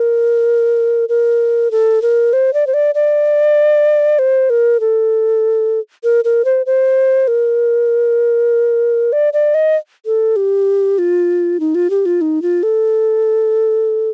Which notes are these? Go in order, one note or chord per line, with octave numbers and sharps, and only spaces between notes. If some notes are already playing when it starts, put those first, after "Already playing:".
Already playing: A#4
A#4
A4
A#4
C5
D5
C5
D5
D5
C5
A#4
A4
A#4
A#4
C5
C5
A#4
D5
D5
D#5
A4
G4
F4
D#4
F4
G4
F4
D#4
F4
A4